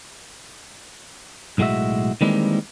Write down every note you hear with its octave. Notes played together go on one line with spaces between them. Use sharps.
B1 A2 G#3 F#4 E5
D#3 E3 G3 G#3 A#3 C4